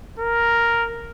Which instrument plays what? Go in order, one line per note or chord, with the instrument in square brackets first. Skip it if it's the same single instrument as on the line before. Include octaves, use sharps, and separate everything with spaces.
[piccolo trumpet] A#4